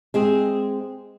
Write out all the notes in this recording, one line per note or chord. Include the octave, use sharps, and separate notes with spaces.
G#3 C4 G#4